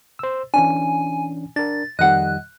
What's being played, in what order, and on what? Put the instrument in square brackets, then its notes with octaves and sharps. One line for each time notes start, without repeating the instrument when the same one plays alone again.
[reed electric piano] C5 E6
[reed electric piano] E3 C#4 D4 [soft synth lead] G#5
[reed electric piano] D4 A#4 [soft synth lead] A6
[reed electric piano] F2 D#3 G3 [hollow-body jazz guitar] D#5 F#5 [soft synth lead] F#6